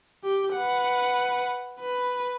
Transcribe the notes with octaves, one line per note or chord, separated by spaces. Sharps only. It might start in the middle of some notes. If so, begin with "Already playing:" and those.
G4
B4 F#5
B4